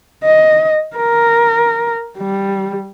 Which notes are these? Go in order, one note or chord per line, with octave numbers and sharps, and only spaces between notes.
D#5
A#4
G3